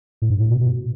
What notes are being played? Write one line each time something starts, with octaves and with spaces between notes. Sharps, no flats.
A2
G2
A2
B2
B2